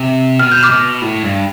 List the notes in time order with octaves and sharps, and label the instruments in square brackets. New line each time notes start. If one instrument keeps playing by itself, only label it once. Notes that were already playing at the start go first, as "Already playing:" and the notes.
Already playing: [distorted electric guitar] C3
[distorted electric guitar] B2 [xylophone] F6
[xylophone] G6
D6 F6
[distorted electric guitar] B2
A2
G2